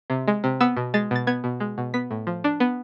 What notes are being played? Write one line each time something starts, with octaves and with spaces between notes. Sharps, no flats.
C3
G#3
C3
B3 E6
B2
G#3 A6
B2 A6
B3 G#6
B2
G#3
B2
B3 B6
A2
F3
D4
B3